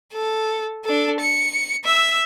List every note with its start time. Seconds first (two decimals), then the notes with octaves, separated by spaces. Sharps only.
0.13 A4
0.85 D4 A4
1.20 C#7
1.84 E5 E6